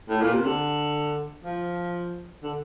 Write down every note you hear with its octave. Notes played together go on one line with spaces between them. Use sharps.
A2
A#2
C3
D3
F3
D3